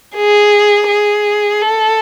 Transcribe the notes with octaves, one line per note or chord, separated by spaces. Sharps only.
G#4
G#4
A4